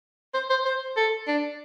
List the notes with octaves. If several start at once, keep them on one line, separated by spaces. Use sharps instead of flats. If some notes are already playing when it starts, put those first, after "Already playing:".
C5
C5
C5
A4
D4